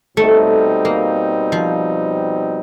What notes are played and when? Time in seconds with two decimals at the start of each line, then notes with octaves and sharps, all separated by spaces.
0.17 B2 G3 A3 C4 D#4
0.85 A#3
1.52 F3